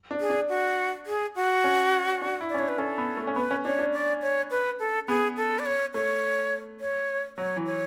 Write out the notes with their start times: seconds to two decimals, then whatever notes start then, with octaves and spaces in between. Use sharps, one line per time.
0.11 D4
0.20 G#4
0.30 D4
0.49 F#4
1.06 G#4
1.36 F#4
1.64 C#4
2.21 D4
2.41 E4
2.49 D5
2.54 C#4
2.59 D4 C#5
2.69 B4
2.78 C#4 A4
2.98 B3
3.17 A3
3.27 C#4
3.36 B3 B4
3.51 C#4
3.65 D4 C#5
3.79 D4
3.93 D5
4.22 C#5
4.51 B4
4.80 A4
5.08 B3 G#4
5.37 A4
5.59 D5
5.66 C#5
5.94 A3 C#5
6.80 C#5
7.37 F#3 C#5
7.56 E3
7.66 C#5